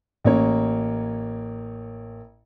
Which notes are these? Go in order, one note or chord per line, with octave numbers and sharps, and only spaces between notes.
A1 A#3 C#5